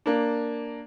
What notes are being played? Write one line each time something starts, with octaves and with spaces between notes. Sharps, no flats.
A#3 D4